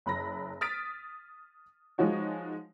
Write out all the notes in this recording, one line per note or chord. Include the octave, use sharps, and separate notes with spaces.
F#1 B5 A#6
D#6 F6 A6 B6 D7
F3 G#3 D#4 F#4 C#5